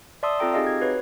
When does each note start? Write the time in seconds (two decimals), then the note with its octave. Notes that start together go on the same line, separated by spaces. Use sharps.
0.23 D5 E5 A5 C6 D#6 E6
0.39 C4 F4 A4 G5 A#5
0.54 C4 D#4 G4 G#4 D#5 F5
0.67 G#6
0.81 F#4 B4 C#5